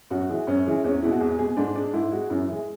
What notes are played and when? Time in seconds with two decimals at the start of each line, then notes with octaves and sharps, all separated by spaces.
0.10 F#2 F#4
0.29 E3 G#3
0.47 F#2 C#4
0.66 E3 G#3
0.84 E2 C#4
1.02 B2 G#3 E4
1.11 F#4
1.20 E2 G#4
1.39 B2 G#3 G#4
1.57 G#2 D4
1.75 G#3 D4
1.93 G#2 E4
2.12 G#3 F#4
2.30 F#2 E4
2.48 E3 G#3